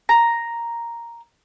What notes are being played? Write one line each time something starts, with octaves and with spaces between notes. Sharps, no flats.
A#5